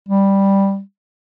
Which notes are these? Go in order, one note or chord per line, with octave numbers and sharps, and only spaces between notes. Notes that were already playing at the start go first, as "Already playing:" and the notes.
G3